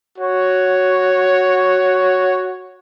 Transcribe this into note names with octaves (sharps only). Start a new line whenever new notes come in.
F#4 C#5